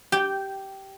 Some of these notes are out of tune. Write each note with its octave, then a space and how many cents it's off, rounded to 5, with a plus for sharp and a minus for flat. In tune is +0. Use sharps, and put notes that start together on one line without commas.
G4 -10 G5 +0